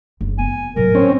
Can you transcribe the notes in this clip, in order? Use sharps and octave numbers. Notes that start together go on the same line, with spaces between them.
F#1
B3 G#5
A2 F#3 A#4
C4 C#4